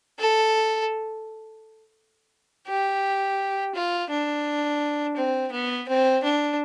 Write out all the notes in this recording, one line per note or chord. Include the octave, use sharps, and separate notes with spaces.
A4
G4
F4
D4
C4
B3
C4
D4